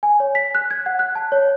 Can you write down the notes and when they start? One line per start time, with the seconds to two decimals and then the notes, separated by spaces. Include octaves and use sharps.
0.03 G#5
0.20 C#5
0.35 B6
0.55 F#6
0.71 G#6
0.86 F#5
0.99 F#6
1.15 A5
1.32 C#5